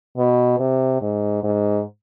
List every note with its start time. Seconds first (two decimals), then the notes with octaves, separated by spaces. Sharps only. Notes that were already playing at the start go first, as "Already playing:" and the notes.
0.17 B2
0.60 C3
1.01 G#2
1.43 G#2